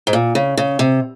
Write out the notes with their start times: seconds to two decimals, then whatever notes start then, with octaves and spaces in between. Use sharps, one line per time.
0.07 G#2
0.13 A#2
0.35 C#3
0.57 C#3
0.79 C3